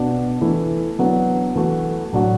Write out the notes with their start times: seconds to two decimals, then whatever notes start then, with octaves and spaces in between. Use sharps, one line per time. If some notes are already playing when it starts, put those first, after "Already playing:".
Already playing: B2 B3 D4 F#4
0.41 E3 A3 E4
0.99 F#3 B3 D4 F#4
1.55 E3 A3 F#4
2.12 A2 F#3 D4 F#4